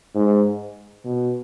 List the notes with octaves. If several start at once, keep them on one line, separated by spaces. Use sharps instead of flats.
G#2
B2